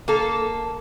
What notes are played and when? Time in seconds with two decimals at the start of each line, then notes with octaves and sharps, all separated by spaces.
0.08 A#3 A4